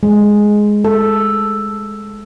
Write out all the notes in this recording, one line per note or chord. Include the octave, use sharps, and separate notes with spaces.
G#3
A4